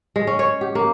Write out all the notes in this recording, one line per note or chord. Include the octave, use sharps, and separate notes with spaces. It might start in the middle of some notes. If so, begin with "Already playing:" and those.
G#3
C#4
C#5
G4
A#3